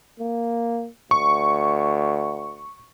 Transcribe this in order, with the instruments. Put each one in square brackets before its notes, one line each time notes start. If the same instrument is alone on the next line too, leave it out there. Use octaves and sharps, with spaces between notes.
[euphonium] A#3
[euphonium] D2 [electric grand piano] C#6